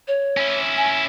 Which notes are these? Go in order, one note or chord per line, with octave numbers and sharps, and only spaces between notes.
C#5
C#4 E4
G#5